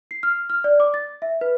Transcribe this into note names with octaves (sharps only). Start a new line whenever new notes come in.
C7
F6
F6
D5
D6
A6
E5
B4